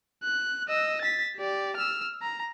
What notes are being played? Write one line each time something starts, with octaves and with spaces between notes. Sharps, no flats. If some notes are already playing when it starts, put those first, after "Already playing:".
F#6
D#5 E6
A6 B6
G4 D5
E6 F6
A#5